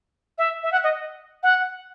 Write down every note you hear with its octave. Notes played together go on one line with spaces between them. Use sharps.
E5
E5
F#5
D#5
F#5